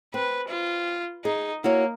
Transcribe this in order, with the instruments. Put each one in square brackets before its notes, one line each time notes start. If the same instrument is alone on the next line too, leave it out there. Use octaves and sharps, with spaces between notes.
[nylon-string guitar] C4 [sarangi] B4
[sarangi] F4
[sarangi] D#4 [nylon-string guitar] G#4
[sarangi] A#3 [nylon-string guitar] E4 F#4 C#5